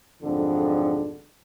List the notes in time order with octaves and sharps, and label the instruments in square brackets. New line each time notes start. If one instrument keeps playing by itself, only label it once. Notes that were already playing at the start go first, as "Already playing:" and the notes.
[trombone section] B1 F2 G#2 D3